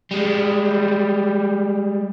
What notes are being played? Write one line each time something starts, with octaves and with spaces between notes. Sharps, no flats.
G3 G#3